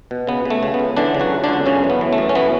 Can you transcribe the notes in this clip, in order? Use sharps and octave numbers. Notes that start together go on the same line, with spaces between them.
B2
C#3 B3
C#3 A3
C#3
B3
C#2
D3 E3 D4
C#3
F#3 F#4
C#2
C#2 D3 D4
F#2 C#3 C#4
E3
B3
E3
A3
F#2
C#4
E3 B3